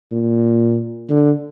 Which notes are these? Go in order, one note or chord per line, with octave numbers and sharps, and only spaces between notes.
A#2
D3